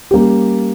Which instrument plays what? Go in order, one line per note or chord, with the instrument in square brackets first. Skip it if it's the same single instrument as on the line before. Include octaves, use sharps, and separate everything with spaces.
[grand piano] G3 A#3 C#4 G4